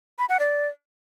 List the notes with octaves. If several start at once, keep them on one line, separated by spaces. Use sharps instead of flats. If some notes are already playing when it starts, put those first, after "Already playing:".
B5
F#5
D5